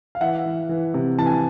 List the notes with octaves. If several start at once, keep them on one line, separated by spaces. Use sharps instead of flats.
F5
E3 E5 F#5
E3
E3
C3
E3 A5
G#5